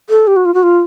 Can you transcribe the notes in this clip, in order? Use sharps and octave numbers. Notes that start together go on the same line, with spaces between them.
A4
G4
F#4
F4
F#4
F4